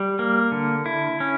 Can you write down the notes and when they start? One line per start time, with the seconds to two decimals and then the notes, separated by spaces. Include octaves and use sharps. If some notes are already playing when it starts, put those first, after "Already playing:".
Already playing: G3
0.19 A#3
0.52 D3
0.86 E4
1.20 C#4